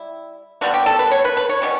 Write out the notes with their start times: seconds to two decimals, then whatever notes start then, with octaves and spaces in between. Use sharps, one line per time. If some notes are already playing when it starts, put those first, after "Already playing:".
Already playing: G3 E4
0.61 D3 G3 B3 F#4
0.74 G4
0.86 A4
0.99 B4
1.11 C#5
1.25 B4
1.37 B4
1.49 C#5
1.62 B2 G3 C#4